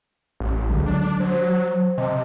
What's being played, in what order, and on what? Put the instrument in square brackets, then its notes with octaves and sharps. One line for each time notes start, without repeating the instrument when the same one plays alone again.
[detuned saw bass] A1
[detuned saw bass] C#2 [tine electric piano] D3 F#3 G#3
[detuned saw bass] D4
[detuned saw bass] F#3 [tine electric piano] C5
[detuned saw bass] C3 [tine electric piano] D#5 A5